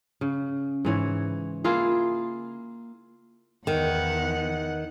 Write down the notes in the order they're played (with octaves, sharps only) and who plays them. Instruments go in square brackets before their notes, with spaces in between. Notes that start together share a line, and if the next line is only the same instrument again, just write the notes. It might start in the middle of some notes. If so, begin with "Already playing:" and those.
[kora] C#3
G#2 E3 C#5
A#3 E4 F4 G#4
[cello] E2 F#5 [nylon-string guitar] D#3